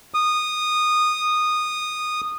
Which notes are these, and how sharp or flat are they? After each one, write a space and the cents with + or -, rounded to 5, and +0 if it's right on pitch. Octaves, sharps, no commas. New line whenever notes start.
D#6 -15